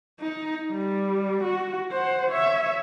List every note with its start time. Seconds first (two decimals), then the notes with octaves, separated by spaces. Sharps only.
0.20 D#4
0.71 G3
1.43 F#4
1.92 C5 F#5
2.31 C#5 E5